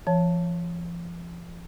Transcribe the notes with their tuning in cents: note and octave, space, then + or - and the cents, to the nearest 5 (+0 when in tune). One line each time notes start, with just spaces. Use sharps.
F3 -35 C#5 -5 A5 +0